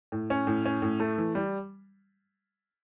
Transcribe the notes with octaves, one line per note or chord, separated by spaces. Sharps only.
A2
C#4
A2
C#4
A2
A3
E3
G3